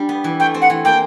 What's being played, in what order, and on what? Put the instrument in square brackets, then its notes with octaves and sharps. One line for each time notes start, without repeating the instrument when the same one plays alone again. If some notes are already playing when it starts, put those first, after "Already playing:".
Already playing: [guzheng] G3 D4
B3
E3
[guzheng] A3 [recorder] G5
[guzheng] C4
[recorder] F#5
[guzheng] E3
[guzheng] A#3 [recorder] G5